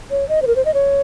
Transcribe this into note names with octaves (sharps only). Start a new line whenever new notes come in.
C#5
D#5
C5
A#4
C5
D#5
C#5